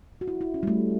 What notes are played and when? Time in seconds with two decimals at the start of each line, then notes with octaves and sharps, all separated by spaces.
0.21 F#4
0.28 E4
0.41 E4
0.54 C#4
0.63 G3
0.67 A3